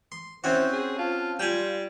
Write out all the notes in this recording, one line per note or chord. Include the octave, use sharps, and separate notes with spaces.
C6
C4 C#4 E4 F#4 C5
G#4
F4 A5
G3 F4 G5 G#5